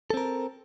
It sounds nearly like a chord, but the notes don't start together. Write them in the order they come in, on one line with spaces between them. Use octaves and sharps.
A4 C4 A#4